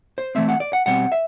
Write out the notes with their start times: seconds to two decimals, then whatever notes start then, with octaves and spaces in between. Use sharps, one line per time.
0.18 C5
0.35 E3 A3 C4 E5
0.49 F#5
0.60 D5
0.73 F#5
0.86 B2 G3 C4 F#5
1.12 E5